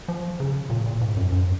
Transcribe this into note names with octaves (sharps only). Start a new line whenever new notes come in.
F3
C#3
A#2
A#2
G#2
F#2
F#2